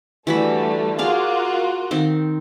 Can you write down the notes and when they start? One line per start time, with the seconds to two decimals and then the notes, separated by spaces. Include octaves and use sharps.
0.27 D3 E3 G3 A3 F#4 B5
0.99 F4 F#4 G#4 A#4 D5 F5
1.91 D#3 C4